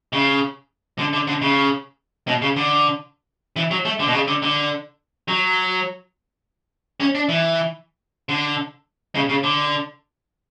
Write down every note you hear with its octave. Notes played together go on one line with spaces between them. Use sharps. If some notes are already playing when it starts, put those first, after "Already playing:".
C#3
D3
D3
D3
C#3
B2
C#3
D3
E3
F#3
A3
D3
B2
C#3
D3
D3
F#3
C#4
D4
E3
D3
C#3
C#3
D3